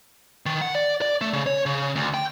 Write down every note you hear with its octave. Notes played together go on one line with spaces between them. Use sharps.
D#3
F#5
D5
D5
A3
C#3
C#5
C#3
D2
G5